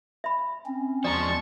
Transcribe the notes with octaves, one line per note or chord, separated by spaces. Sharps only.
E5 B5
C4 C#4
E2 F3 G#3 D5 A5 A#5 C#6 A6